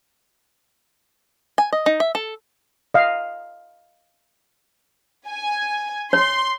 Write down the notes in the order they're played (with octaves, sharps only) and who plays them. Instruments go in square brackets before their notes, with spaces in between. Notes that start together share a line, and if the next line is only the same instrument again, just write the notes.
[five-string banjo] G#5
D#5
D#4
E5
A4
[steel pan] D#5 F5
[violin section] G#5
[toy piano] C#5 [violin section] C6